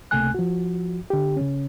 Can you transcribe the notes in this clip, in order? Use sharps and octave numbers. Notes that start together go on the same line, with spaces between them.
C#2 C3 A3 A#3 G#5 F#6
F3 F#4
D3 G4
C#3 C#4